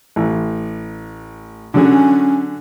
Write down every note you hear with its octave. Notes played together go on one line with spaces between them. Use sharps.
A1 E3
D3 F#3 C#4 G#4